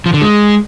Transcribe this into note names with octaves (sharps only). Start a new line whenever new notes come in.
F3
D3
G#3